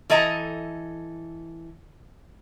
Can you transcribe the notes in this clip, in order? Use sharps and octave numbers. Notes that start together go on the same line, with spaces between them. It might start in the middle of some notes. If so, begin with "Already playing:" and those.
E3 A4 D#5 A#5